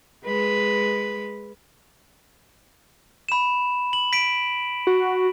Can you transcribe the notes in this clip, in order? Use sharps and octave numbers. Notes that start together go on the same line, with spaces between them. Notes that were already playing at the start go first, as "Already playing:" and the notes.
G#3 B4
B5 E7
F#7
B6 D7
F#4